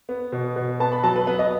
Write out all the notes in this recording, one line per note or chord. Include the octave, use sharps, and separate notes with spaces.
B3
B2
B2
B3 A5
B5
F#3 A5
B4
B3 B4
D#5